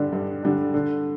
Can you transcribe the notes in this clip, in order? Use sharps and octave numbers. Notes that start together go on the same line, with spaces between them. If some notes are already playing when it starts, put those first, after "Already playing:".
Already playing: G2 D3 G3 D4
G2
D3 G3 D4
D3